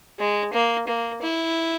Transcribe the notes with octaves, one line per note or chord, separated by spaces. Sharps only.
G#3
A#3
A#3
E4